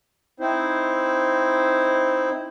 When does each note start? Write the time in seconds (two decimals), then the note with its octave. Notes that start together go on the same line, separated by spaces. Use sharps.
0.40 C4 D#4 E4 C5